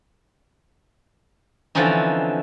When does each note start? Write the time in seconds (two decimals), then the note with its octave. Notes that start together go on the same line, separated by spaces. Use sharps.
1.75 D3 E3 F3 C4 C#4 D#4